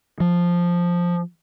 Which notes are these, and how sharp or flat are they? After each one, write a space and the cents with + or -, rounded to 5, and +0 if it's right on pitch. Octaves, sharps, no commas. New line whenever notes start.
F3 +0